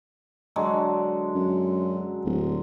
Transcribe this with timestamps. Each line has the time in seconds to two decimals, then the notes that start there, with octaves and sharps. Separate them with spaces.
0.56 D3 F#3 G#3
1.34 F#2
2.25 D1